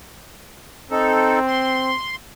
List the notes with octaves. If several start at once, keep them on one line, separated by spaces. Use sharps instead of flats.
C4 D#4 A4
C6